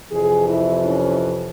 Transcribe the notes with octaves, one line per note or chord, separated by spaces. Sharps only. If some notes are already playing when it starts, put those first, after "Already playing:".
F2 C3 E3 G#4
E4
C#4